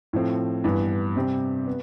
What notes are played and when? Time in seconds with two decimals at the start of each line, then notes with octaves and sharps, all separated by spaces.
0.13 A2 F3 C4
0.64 G2 E3 B3
1.16 C3 G3 C4 G4
1.67 B3